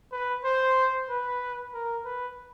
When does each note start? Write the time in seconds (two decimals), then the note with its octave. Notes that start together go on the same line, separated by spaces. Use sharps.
0.13 B4
0.44 C5
1.09 B4
1.74 A#4
2.05 B4